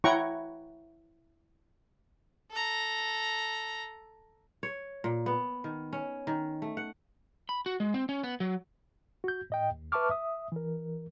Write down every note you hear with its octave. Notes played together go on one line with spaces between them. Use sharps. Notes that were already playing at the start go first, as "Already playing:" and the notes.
E4 C#5 F#5 G5 A#5 C#6
A4 A#5
C#5
A#2
B3
D#3
C#4
D#3
A3
F#5
B5
F#4
G#3
C4
C#4
B3
F#3
F#4 G6
A2 D#5 G5
D#2
B4 E5 A5 C#6 D6 F6
E5 D#6
E3 A#4